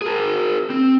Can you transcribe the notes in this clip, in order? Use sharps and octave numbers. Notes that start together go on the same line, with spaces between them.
G#4 A#4
C4